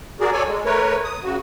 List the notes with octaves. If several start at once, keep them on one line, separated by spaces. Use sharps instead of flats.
F#4 G#4 A#4 D5
A4 C#5 D5 G#5
G#3
A3 A#4 B4 C#5
D#6
C#3 F#4